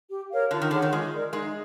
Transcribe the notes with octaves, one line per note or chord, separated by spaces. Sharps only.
G4
A#4 C#5 F5
D3 F4
D#3
D3 G#4 C#5 F#5
D#3
G#3 F4
A#4 D5
G#3 D#4